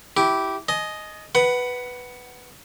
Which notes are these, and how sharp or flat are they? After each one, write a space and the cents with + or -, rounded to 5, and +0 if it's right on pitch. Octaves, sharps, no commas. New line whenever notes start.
E4 -5 G4 -15
D#5 +0 G#5 +40
B4 +0 F#5 +15